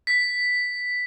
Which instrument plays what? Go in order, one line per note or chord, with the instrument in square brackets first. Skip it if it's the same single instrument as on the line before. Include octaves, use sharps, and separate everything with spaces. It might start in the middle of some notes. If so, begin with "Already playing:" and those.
[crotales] B6